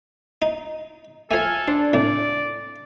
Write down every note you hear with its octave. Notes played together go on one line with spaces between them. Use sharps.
D#4
F3 A3 A4 G#5 F6 G#6
D4 C5
C2 A2 D5